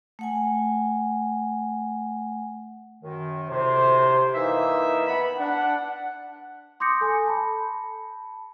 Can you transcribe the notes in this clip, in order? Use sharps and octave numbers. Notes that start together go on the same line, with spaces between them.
A3 F#5 G#5
F#2 D#3
D2 A2 C3 C5
E3 A#3 D#4 E5
B3 B5
D4 F#5
C6 D6 D#6 G6 A#6 C#7
A4 G#5
A5 B5